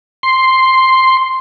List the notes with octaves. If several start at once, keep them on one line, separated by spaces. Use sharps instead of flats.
C6